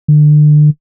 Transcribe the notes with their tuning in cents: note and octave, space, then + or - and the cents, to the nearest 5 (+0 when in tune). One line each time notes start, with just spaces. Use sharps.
D3 +30